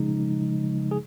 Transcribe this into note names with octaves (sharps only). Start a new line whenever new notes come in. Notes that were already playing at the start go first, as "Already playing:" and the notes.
Already playing: C#3 F3 G#3 D#4
G#4